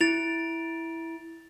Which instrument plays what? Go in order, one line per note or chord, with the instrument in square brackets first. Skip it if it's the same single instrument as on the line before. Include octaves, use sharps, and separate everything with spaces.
[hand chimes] E4 D7 [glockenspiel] A6 F7